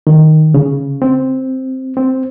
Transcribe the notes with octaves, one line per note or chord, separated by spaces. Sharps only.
D#3
C#3
C4
C4